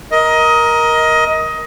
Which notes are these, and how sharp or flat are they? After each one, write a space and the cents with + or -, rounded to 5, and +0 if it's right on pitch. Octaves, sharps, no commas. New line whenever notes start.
A#4 +10 D#5 +20